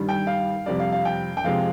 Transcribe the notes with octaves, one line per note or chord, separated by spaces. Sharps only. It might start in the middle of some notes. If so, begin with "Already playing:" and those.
Already playing: G2 D#3 G3
G5
F5
F2 C3 G3 D5
F5
F5
G5
G5
F2 C3 F3 G#3 F5